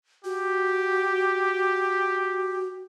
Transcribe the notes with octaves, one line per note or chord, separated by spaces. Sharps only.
F#4 G4